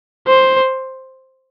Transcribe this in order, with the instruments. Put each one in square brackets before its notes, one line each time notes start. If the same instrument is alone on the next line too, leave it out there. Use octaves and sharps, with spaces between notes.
[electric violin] C5